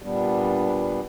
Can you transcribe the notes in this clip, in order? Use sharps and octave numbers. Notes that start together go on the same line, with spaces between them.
A#2 G3 B3 D4